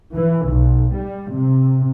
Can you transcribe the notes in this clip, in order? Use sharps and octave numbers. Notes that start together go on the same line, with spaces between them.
E3
B1
G3
C3